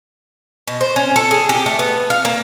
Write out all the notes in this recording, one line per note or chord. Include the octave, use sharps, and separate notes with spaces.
B2
C5
C#4
A4
G#4
G4
A3
B3
F5
A#3